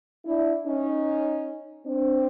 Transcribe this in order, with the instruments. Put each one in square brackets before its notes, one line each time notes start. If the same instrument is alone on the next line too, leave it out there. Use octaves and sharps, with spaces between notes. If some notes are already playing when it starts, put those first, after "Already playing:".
[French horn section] D4 E4
C#4 D#4
C4 D4